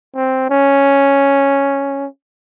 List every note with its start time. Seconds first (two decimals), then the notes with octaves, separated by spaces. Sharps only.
0.15 C4
0.50 C#4